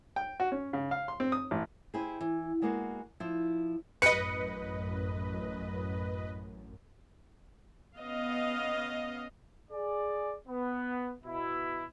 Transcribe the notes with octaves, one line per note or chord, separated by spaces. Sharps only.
G5
F#4
C#4
C#3
F5
C6
C4
D#6
A1
C4 E4 G4 G#4
E3
G3 G#3 A#3 B3 F#4 G#4
F3 E4
A1 F#2 B4 D#5 C#7
B3 C#4 D#5 F5
G#4 D5
B3
B2 E4